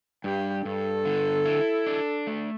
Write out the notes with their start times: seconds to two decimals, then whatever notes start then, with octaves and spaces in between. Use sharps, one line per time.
0.24 G2 G4
0.65 G2 A4
1.05 D3
1.46 E4
1.86 D4
2.27 A3